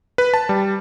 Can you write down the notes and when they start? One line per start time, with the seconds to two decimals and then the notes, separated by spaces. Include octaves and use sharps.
0.18 B4
0.34 A5
0.49 G3